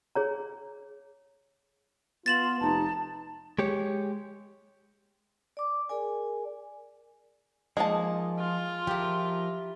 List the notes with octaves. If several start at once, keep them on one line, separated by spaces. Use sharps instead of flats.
G#4 C#5 A#5
B3 F4 A6 E7 F#7
F1 D#4 A5
G#3 G4 C#5
D5 D6
G#4 A#4 D5 G#5
F3 G#3 A#3 D#4 A5 D#6
F4
F3 E4 G4 A#4